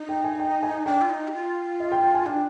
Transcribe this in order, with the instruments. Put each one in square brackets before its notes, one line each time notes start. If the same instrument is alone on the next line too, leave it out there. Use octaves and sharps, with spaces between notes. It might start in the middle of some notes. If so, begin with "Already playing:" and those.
Already playing: [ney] D#4
[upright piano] G5
G#5
G5
G#5
[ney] D4 [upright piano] G5
[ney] F4
D#4
G4
F4
[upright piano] D#5
G5
G5
G#5
[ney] D4 [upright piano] G5